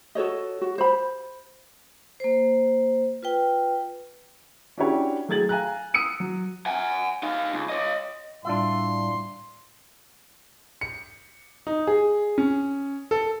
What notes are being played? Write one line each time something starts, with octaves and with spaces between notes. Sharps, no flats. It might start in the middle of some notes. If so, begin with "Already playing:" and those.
F#4 A4 C#5 D#5
F#4
C5 B5
A#3 C5
F4 B4 G5
C#4 D4 E4 F#4 G4 C#5
F#3 A3 G#4 G#6 A6 F#7
F5 G#5 A#5 F#6
D#6 E6 C#7 D#7
F#3
F#5 G#5
D#4 F5
C#2
C#5 D#5
A2 G3 D4 F4 E5 C6
C#7
D#4
G#4
C#4
A4